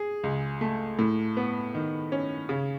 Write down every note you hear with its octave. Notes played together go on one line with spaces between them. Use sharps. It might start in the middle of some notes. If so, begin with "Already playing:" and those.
Already playing: G#4
C#2
A3
A2
B3
D#3
C#4
C#3